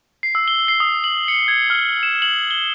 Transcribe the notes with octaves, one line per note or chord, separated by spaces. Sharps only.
C7
E6
G7
C7
D#6
F#7
C#7
G#6
F6
E7
F#7
G7